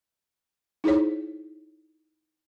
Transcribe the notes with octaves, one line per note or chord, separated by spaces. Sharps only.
D#4 E4 G#4 C5 C#5